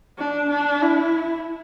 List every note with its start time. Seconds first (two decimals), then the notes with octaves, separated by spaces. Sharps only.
0.18 D4
0.50 D4
0.82 E4